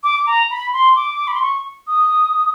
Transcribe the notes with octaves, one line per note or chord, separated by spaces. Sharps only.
D6
A#5
B5
C6
D6
B5
C6
C#6
D#6